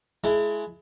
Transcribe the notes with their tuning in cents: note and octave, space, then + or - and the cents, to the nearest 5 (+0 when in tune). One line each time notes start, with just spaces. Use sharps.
G#3 +25 E4 +20 A5 +40